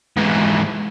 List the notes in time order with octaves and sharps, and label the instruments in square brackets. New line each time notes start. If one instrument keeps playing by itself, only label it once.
[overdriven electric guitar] G#2 E3